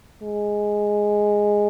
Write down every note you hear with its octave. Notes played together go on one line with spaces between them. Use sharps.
G#3